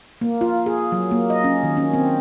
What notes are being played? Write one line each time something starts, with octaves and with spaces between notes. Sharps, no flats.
A#3
F4
G#4
F#3
A#3
D#5
C#4
D#3
C#4
C4